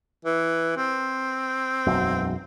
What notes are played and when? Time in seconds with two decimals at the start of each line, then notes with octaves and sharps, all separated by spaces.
0.25 E3
0.77 C4
1.87 E1 B1 F#2